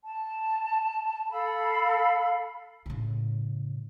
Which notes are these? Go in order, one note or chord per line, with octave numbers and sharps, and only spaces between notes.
A5
A4 F5 B5
A2 C#3